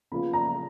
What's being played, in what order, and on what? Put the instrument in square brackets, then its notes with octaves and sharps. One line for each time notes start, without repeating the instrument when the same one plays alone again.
[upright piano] C#3 F3 B3 F4 B5
A#5